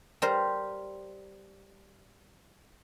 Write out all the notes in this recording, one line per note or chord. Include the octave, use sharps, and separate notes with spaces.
G3 A#4 C5